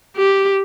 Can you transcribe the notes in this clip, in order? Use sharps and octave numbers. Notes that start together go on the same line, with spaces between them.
G4